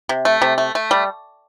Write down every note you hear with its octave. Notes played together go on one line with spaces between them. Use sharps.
C3
A3
C3
A3
A3
G3